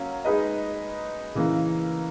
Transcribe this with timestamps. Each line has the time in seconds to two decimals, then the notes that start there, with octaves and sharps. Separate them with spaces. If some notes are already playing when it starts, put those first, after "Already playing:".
Already playing: F#3 A#3 C#4
0.25 G#3 D#4 G#4 B4 D#5
1.35 C#3 E3 A#3